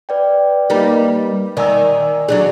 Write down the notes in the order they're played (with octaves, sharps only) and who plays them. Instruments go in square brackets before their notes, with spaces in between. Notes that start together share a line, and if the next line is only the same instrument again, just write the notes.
[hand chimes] B4 D5 G5
[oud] G3 A#3 D#4
[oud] D#3 [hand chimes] D5 G#5 E6
[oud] F#3 D4 G#4